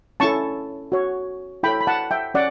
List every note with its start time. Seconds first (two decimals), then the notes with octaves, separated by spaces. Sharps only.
0.20 C#4 E4 A4 A5 C#6
0.92 F#4 C#5
1.63 E4 A4 C#5 G5 B5
1.81 B5
1.87 F#5 A5
2.11 E5 G5
2.34 C#4 D5 F#5